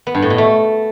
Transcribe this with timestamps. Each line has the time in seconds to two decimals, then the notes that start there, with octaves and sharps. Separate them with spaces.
0.07 B3
0.15 G2
0.22 A2
0.30 B2
0.38 A3